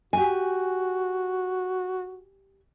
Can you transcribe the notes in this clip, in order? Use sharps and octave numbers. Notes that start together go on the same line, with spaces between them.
F#4 G4 G#5